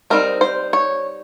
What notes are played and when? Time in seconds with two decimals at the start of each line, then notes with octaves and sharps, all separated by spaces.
0.10 G3 C4 D#4 A#4
0.41 C5
0.73 C#5